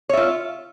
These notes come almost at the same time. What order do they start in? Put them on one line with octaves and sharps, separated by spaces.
C#5 E5 F4